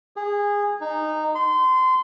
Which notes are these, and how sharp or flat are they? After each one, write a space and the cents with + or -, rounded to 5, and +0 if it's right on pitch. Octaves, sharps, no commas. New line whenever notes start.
G#4 -20
D#4 -15
C6 -25